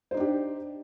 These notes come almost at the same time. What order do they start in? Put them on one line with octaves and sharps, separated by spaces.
C5 D#4 D4 G4